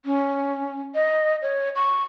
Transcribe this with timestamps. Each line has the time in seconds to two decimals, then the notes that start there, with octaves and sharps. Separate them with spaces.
0.05 C#4
0.95 D#5
1.42 C#5
1.75 C#6